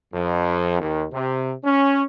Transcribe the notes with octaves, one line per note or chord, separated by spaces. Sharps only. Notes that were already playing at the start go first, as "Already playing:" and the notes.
F2
D#2
C3
C#4